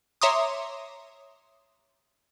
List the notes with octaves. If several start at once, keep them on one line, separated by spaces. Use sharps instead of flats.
C#5 E5 A#5 C6 D6 D#6